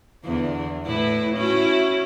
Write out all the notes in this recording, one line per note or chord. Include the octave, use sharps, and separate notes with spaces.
E2 D3
A2 E4 B4
C#4 E4 F#4